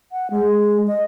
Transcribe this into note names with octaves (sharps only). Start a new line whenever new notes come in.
F#5
G#3
D#5